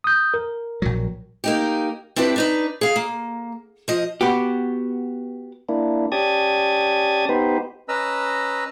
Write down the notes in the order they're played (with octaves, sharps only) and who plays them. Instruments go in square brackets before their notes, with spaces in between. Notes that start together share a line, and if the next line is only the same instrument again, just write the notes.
[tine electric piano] D#6 G6
A#4
[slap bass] A#1 F#3
[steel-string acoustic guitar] A#3 D#4 G4
C4 D4 E4 G4 A4 B4
D4 D#4 B4
G#4 F5
A#3
F3 D#5
[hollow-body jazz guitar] B3 F#4 G4
[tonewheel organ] A#3 D4 E4
C#4 G4 D5 A5 D#6 G#6
B3 D#4 G4 B4 C5
[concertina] C#4 B4 D#5 A#5 E6